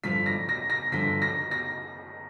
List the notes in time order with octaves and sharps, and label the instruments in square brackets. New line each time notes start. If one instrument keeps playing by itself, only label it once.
[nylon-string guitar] G2 D3 F3 [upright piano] B6
[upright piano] A#6
A#6
A#6
[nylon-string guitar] G2 D3 F3 [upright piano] B6
[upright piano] A#6
A#6